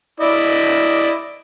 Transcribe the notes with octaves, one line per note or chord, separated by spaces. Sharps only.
E4 D5 D#5